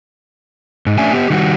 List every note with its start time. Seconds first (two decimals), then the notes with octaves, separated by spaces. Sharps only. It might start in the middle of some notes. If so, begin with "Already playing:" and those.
0.86 G#2
0.98 A3 C#4 D4 E5 G#5
1.13 B3 G4
1.30 D#3 G3 F#4